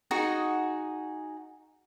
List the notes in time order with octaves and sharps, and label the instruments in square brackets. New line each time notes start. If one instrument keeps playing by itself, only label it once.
[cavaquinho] D#4 F#4 G#4 F#5